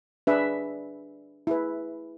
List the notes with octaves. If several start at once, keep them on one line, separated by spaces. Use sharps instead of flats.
D4 G#4 B4 E5
E4 G#4 B4